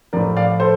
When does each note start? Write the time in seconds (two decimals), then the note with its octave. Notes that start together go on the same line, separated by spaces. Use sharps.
0.13 A2 F3 A#4 D5
0.37 D5 F5
0.60 A4 C5